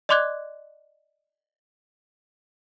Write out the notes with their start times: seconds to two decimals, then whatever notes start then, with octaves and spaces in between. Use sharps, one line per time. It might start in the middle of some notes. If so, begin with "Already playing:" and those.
0.09 D5 D#5 C6 D6 F#6 G#6